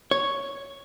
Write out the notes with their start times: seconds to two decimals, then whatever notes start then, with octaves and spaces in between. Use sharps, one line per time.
0.11 C#5